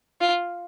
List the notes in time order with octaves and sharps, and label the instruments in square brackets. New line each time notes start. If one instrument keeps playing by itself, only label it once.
[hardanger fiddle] F4